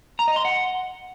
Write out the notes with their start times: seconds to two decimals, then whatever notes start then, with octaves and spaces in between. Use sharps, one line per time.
0.19 A#5
0.28 D#5
0.36 C6
0.45 F#5